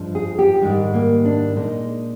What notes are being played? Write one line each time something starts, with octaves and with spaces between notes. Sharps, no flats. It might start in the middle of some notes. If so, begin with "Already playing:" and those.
Already playing: G2 F3 G#3
G#4
G4
G#2 D#3 G3 G#3
A#3
D4
A#2 G#3 D#4